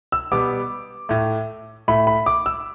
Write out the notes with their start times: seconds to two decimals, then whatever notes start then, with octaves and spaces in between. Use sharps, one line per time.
0.12 E6
0.32 B2 G3 B3 D6
1.09 A2 A3
1.88 A2 A3 B5
2.07 B5
2.26 D6
2.46 E6